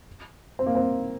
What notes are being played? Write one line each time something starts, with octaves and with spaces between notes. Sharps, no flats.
C4
A#3
C4